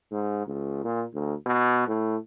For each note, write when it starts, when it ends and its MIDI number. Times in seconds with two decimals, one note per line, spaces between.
0.11 0.43 44
0.47 0.80 37
0.84 1.04 46
1.13 1.34 38
1.46 1.85 47
1.88 2.16 45